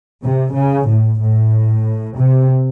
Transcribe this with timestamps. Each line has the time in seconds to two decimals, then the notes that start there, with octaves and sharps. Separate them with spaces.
0.22 C3
0.54 C#3
0.87 A2
1.19 A2
2.15 C3